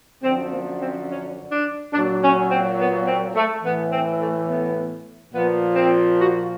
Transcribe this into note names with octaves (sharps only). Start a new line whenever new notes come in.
F#2 D3 F3 C4
A#3
C4
C#4
D4
A#2 F#3 D4
C#4
C4
B3
C4
A3
A2 E3 B3
C4
A3
B3
A#2 F3 B3
C4
F#4